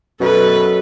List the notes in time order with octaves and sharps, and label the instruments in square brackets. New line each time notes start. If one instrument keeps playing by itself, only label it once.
[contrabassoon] F#2 [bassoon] B2 [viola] A4 B4